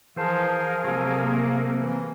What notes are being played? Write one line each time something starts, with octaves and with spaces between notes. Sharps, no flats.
E3 F3 G#4 A#4 C5 F5 A5
C3 F#3 A3 A#3
E3